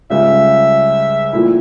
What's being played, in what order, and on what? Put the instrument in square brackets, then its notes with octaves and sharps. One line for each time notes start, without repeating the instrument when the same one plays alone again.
[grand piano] C#2 C#3 G3 C#4 [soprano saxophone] E5
[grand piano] A#1 A#2 A3 E4